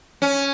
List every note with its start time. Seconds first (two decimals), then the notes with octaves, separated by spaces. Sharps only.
0.22 C#4